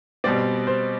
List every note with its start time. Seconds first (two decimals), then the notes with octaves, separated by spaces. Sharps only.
0.24 B2 G3 C4 D5
0.67 C5